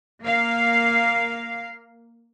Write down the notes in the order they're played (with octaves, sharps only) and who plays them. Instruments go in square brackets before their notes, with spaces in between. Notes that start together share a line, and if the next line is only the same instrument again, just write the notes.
[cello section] A#3 F5